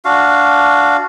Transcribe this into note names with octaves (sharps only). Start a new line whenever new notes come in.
D4 F#4 F5